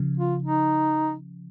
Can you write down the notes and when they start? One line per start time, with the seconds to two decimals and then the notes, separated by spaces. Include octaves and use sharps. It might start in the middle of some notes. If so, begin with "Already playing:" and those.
Already playing: C#3 F3
0.17 F4
0.42 D#4